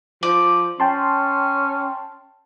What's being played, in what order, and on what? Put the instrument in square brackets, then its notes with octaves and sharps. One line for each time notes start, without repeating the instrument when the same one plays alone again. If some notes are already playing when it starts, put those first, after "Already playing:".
[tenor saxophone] F3 [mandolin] D5
[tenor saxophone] C#4 [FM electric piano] G5 A5 C6